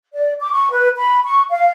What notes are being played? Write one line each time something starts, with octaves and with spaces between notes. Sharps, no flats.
D5
D6
C#6
B4
B5
C#6
F5